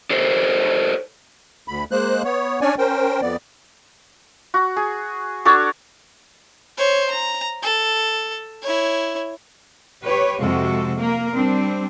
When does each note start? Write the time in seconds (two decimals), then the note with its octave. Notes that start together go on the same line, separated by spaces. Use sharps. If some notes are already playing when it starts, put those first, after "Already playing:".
0.10 G4 A4 C5 C#5
1.68 D2 B5
1.91 G#3 A#3 C5 F#6
2.24 B3 C#5
2.61 C#4 D4 C#5 D5 G#5
2.78 C#4 A#4 C5 G5
3.22 F2 B3 D5
4.54 F#4
4.76 G#4
5.45 D4 F#4 A4 C#5
6.77 C5 C#5
7.10 A#5
7.62 A4
8.62 E4 C#5
10.03 G4 B4 C#5
10.39 F2 C3 G#3 F#4 A4
10.95 A#3 A#4
11.32 G3 C4 D4